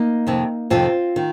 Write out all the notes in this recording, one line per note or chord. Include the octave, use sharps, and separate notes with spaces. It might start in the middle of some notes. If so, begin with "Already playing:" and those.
Already playing: A#3 D#4
F2 C3 D#3
F2 C3 D#3 C4 F4
D#3